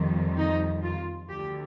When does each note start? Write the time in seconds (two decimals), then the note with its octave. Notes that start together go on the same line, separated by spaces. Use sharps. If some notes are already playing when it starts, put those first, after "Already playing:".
Already playing: F2 D#3 G3
0.37 D#4
0.83 F4
1.29 D2 D3 G3 G4